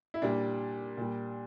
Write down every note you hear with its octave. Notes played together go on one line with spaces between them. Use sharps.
E4
A#2 G3 D4
A#2 G3